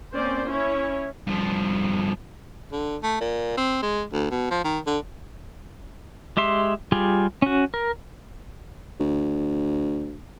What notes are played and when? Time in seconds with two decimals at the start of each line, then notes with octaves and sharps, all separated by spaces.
0.14 A#3 C4 C#4 C5 D5
0.46 C#4 E4 C#5
1.27 G2 F3
2.72 D3
3.03 A3
3.20 A#2
3.57 C4
3.82 G#3
4.13 D2
4.31 B2
4.51 F3
4.64 D#3
4.87 D3
6.37 G#3 G4 E5 C6
6.92 G3 F4 G4 G#4
7.42 C#4 F#4
7.74 A#4
9.00 D2